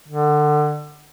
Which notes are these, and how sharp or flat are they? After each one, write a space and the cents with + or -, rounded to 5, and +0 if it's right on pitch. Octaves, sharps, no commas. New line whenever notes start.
D3 +25